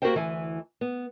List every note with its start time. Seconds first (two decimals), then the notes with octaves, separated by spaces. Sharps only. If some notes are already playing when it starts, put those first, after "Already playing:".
0.02 A#3 F#4 G4 A#4 C5 G5
0.14 D2 E3 G#5
0.81 B3